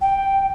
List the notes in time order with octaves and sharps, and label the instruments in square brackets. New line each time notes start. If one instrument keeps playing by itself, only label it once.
[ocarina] G5